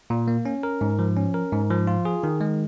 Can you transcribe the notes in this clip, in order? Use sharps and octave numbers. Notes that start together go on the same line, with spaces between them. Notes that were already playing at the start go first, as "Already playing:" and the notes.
A#2
A#3
C#4
A#4
G#2
F3
C#4
A#4
G#2
F3
F4
G#4
D#3
G#3